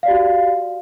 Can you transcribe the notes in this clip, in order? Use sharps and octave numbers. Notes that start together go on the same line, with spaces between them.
F#4 G4 D5 F5